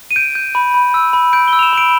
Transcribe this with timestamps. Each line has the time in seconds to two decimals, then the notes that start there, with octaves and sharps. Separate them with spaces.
0.11 D#7
0.16 G6 D7
0.35 G6
0.55 B5
0.74 B5
0.94 E6
1.13 B5
1.33 G6 D7
1.48 G7
1.53 E6
1.59 F7
1.63 E7
1.73 B5 D7